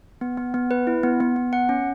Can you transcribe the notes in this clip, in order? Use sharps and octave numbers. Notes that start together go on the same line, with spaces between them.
B3
B3
B3
B4
E4
B3
B3
B3
F#5
C#4